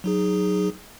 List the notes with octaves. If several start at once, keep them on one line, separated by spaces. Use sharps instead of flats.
F#3 D#4 G#4